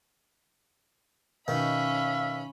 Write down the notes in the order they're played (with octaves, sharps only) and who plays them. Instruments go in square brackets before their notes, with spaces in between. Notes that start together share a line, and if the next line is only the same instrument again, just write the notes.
[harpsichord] B2 D#3 [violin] C#4 B5 [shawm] E5 [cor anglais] F5